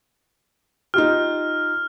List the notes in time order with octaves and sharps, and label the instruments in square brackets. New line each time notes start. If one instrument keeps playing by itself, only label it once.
[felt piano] D#4 F4 G4 [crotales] F6